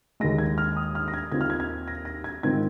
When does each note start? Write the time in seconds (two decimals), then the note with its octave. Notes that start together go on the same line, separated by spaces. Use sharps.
0.20 D#2 D#3 G#3 A#6
0.38 G#6
0.58 F6
0.76 D#6
0.95 F6
1.08 A#6
1.14 G#6
1.32 D#2 D#3 C4 F4 G#6
1.41 F6
1.50 G#6
1.60 G#6
1.88 A#6
2.05 A#6
2.24 G#6
2.43 G#2 D#3 C4 F4 G#6